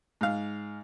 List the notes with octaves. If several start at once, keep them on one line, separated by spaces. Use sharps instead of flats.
G#2 F5